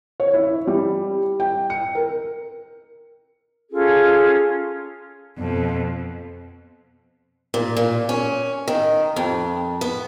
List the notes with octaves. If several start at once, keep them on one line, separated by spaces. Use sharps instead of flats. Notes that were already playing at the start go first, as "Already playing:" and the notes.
C#5
E4
G3
G5
C#7
A#4
C#4 F4 G#4 A4
F2 B2
A#2
A#2
C#4
D#3
F2
B3